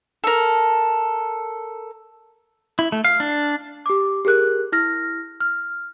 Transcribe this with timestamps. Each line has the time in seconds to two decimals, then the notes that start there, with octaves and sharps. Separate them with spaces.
0.24 A4 A#4
2.79 E4
2.92 A3
3.05 F5
3.20 D4
3.86 G4 D6
4.25 G4 G#4 A#4 F#6
4.72 E4 F6 A#6
5.40 F6